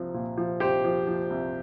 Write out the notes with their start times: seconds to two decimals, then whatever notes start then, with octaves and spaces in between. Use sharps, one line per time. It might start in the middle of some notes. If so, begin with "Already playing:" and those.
Already playing: C2 F3
0.14 A#2
0.38 F3
0.60 C2 G4 C5
0.84 F3
1.07 F3
1.30 C2